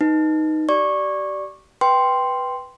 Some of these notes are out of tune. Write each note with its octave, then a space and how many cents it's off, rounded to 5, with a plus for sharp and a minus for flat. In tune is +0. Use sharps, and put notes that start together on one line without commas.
D#4 +0 B4 +0
G4 -35 D5 +0 C#6 -15
B4 +0 G5 +0 C6 -5